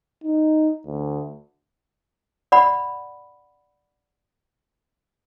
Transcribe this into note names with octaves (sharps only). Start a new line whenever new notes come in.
D#4
D2
D5 F#5 B5